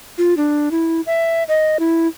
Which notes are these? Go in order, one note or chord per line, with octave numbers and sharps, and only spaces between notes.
F4
D4
E4
E5
D#5
E4